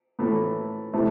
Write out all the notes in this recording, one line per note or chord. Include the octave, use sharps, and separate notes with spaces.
A2 E3 A3
C3 E3 A3